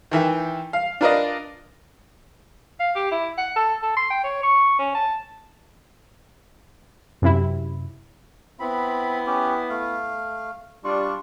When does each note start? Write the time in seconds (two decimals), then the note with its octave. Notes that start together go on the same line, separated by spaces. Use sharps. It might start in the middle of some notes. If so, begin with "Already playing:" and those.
0.11 D#3 E3 E5 G5
0.73 F5
1.01 D4 F4 A#4 B4 D5 D#5
2.80 F5
2.96 G4
3.11 E4
3.38 F#5
3.56 A4
3.83 A4
3.97 C6
4.10 G5
4.24 C#5
4.43 C#6
4.79 C#4
4.95 A5
7.22 F#2 C3 E4
8.60 B3 C4 E4 B5
9.27 C#4 G4
9.70 A3 F5
10.84 G3 D4 F4 C#6